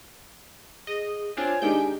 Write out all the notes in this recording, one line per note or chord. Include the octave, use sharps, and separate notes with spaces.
G#4 D#5
C4 D4 F4 C#5 G#5
D#3 G#3 D4 D#4 G4 G5 G6